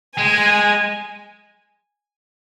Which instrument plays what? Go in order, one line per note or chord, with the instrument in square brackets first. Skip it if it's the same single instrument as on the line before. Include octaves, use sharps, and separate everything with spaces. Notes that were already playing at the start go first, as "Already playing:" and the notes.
[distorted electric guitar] G#3 [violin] G#5